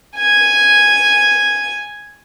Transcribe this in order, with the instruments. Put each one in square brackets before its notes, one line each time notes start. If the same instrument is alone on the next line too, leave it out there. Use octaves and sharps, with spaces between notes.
[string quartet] G#5 G#6